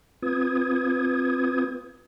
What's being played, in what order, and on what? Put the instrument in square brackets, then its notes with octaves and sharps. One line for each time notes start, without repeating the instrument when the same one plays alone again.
[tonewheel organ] C4 F4 B4 D#6 G#6